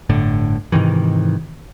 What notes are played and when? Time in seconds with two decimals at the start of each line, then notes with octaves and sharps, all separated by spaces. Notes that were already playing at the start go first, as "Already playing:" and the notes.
0.09 G1 A2 D3
0.72 G#2 C3 D#3 E3